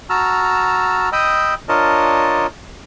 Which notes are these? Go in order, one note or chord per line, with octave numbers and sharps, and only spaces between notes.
F#4 A5 A#5 E6 F6
D#5 G5 B5 D#6 E6
D4 F4 A#4 C#5 D#5 A5